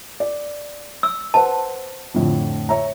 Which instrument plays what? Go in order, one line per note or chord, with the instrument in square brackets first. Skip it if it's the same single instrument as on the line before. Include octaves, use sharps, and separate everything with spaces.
[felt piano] D5
[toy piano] E6
[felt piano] B4 C5 F#5 [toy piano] A5
[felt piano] F2 A2 D3
C#5 E5 A#5